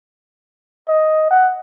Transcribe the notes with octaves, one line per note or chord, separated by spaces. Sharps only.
D#5
F#5